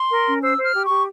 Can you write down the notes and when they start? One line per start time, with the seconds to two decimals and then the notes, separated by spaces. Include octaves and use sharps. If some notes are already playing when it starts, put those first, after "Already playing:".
Already playing: C6
0.10 A#4
0.27 C#4
0.42 C5 E6
0.57 C5
0.63 F6
0.74 G4
0.84 C#6
0.89 G4